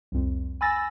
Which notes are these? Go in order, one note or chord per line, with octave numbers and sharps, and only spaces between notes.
C2 F2
G#5 B5 E6 A6 A#6